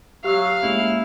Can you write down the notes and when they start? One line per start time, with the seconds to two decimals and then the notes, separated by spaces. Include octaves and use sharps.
0.24 F#3 G4 F5 E6
0.62 G#3 A#3 C#4 E4